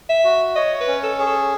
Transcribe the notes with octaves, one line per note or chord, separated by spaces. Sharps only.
E5
F#4
C#5 D#5
B4
C#4
A4
G#4
A4